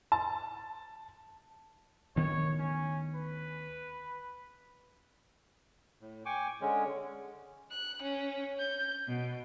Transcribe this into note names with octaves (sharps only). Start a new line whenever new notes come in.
A5
D2 D#3 B3 C#5
C#4
B4
A2
G5 G#5 C#6 D6
D3 G#3 C#4
F#6
C#4
G6
B2